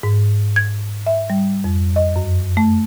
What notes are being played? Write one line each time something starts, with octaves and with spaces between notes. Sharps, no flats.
G#2
G#6
E5
G3
F2
D#5
F#2
A3